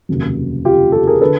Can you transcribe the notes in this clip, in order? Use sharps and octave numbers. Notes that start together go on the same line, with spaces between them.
F1 D#2 C#3 F#3
F4 G4
G4 A4
G#4 A#4
D3 A4 B4